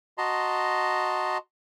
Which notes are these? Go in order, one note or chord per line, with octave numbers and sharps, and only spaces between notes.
F#4 D#5 A5 A#5 C6